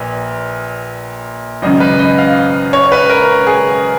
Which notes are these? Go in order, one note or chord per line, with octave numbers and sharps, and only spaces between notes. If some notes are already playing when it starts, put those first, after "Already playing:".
Already playing: A#1 A#2 B4
G#1 F#2 C#3 D#5
B4
D#5
F5
C#5
B4
A#4
G#4